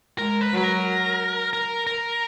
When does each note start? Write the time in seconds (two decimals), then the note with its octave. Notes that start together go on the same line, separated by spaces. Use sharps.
0.18 G#3 A#4
0.41 B4
0.52 F#3
0.57 B4
0.64 A#4
1.53 A#4
1.87 A#4